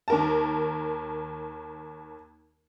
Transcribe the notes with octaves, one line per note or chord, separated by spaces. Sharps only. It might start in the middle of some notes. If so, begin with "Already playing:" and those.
D#2 A#4 A5